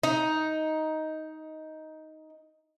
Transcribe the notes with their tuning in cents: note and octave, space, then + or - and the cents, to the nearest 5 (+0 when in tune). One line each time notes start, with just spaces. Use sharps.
D#4 +10